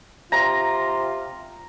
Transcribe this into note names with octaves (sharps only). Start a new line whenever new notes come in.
C3 F4 A#5